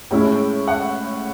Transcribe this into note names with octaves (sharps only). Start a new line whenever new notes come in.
A2 G#3 C#4 E4
F#5